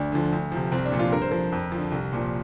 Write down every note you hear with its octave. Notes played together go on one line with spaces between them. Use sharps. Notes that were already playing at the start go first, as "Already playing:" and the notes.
Already playing: D2 D4
D3 F3
D2
C3 F3
C2 C4
D4
A#2 F3
F4
G2 A#4
C5
F3 A#4
F2
D3 F3
C2
A#2 F3